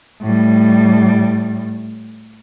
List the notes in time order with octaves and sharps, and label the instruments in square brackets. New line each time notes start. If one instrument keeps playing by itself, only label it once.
[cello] A2 G3